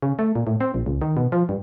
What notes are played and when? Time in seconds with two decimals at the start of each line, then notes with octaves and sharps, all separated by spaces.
0.02 C#3
0.19 A3
0.35 A#2
0.47 A2
0.61 C4
0.74 A#1
0.86 C#2
1.02 D#3
1.17 B2
1.32 F3
1.49 G2